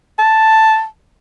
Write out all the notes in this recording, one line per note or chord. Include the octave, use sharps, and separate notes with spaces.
A5